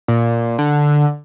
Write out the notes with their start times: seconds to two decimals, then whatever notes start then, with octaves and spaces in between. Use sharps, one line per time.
0.08 A#2
0.58 D3